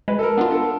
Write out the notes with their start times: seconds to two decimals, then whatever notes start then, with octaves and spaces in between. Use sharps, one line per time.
0.08 G#3 B4
0.19 A4
0.23 A#4
0.38 B3 D4 F4
0.51 A4